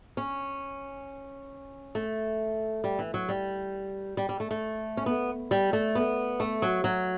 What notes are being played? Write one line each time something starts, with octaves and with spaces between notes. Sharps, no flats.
C#4
A3
G3
E3
F#3
G3
G3
G3
A3
A3
C#4
B3
G3
A3
B3
A3
F#3
F#3